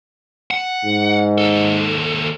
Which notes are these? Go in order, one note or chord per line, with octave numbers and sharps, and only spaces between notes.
F#5
G#2
D#2 A4